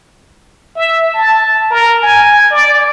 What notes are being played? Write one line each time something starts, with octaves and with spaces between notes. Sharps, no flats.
E5
A5
A#4
G#5
D5